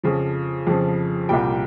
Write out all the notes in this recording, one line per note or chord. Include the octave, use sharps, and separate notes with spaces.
F2 C#3 F3
F2 C#3 F3
C2 A#2 G3 G5